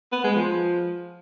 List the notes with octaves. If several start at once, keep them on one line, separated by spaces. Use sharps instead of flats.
B3
G#3
F3